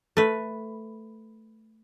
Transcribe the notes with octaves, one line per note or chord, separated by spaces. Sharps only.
A3 B4